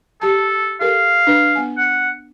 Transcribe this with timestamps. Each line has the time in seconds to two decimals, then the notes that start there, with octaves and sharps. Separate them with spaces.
0.21 G4 A4 A5
0.80 G4 A4 A#4 F5
1.27 D4 B4
1.55 B3 G#5
1.77 F#5